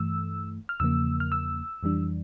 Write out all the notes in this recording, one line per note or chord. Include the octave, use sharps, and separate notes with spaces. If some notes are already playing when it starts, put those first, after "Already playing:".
Already playing: G2 E3 A3 E6
F6
E2 C#3 F3 A#3 E6
F6
E6
F2 E3 G3 D4